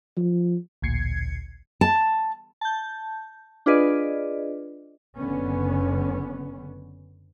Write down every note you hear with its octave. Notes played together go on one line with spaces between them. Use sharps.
F3
A1 D2 A#2 G#6 C7 C#7
A5
A5 G6
D4 F4 G#4 B4 D5 D#5
F#1 D3 B3 C#4